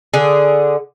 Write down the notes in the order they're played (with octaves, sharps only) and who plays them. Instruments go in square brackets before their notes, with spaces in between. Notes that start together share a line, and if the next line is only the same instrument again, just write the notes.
[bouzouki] D3 G#4